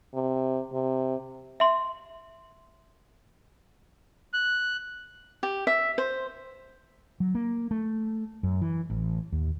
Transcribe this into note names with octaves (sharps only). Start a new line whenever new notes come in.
C3
C3
E5 C6
F#6
G4
E5
C5
F#3
A#3
A3
F#2
E3
A1
D#2